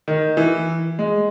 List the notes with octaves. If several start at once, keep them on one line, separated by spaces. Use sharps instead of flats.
D#3
E3
G#3